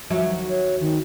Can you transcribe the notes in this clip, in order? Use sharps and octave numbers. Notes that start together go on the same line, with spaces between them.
D#2 F3 F#3 E5
C#5
D#3